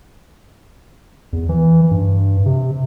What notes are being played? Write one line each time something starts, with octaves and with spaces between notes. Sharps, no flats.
E2
E3
G2
C3